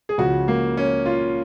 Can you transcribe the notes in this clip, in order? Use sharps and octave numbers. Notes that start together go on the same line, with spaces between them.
G#4
C#2 C#3 F3 F#4
A#3
C#4
F4